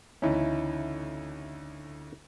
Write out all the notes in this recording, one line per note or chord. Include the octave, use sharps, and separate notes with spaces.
D2 C#3 E3 C#4 D#4 E4